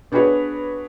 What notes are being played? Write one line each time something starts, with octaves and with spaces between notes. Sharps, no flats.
B3 D4 F#4 G#4 B4 C#5